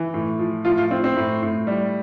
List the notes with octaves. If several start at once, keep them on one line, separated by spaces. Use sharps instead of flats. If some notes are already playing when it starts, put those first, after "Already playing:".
Already playing: E3
A2
F3
A2 F3 F4
F3 F4
F3 C4
C4
A2
A2
G3